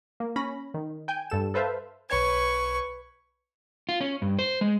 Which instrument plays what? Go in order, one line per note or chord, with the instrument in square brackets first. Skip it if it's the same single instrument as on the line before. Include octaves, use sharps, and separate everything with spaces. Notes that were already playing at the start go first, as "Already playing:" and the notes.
[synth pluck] A#3
C#4 B5 A#6
D#3
G5 G#5 G6
G2 A4 E7
A4 B4 C5 E5 F5 A5
[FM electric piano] B1 C#5 G#6 [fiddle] B4 C#6
[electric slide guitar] F4
C#4
G2
C5
G#3